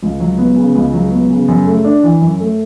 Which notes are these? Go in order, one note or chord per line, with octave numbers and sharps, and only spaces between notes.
C#2
F#3
B3
C#3
C#2
F#3
B3
C#3
F#2
A3
D4
E3
F#2
A3